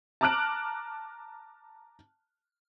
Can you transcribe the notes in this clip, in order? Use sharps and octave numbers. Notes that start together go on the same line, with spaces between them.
A5 A#5 D6 F6 F#6 D7